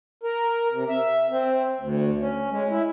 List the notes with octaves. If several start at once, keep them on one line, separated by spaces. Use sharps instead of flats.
A#4
C3
E5
C4
D2
C#4
G#3
E4